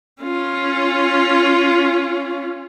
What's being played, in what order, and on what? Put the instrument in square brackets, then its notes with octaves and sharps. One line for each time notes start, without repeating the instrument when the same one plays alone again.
[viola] C#4 F4